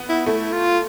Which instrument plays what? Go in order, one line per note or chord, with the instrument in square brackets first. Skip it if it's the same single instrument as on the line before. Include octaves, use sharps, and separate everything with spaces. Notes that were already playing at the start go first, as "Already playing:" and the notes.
Already playing: [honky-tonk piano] B3
[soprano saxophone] E4
[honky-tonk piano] A3 [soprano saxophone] E4
[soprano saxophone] F4